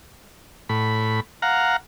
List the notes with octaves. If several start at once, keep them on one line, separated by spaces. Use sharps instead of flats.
A2 B5
F5 F#5 A#5